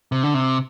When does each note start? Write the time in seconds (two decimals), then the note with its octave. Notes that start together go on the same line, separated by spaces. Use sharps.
0.12 C3
0.23 D3
0.34 C3